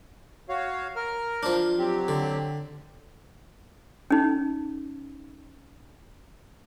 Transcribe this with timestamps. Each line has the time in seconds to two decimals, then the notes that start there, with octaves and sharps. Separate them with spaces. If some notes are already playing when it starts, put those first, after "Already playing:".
0.49 F#4 C#5 F5
0.96 A#4 F6
1.43 F3 D4
1.79 F#3 C4 G4
2.08 D3
4.10 C#4 D#4